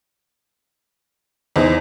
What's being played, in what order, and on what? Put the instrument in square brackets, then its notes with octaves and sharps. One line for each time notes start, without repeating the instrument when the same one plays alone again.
[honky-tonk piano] E2 [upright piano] D#4 C5 D#5